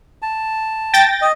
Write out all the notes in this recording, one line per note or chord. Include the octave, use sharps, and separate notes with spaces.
A5
G5 A6 A#6
D#5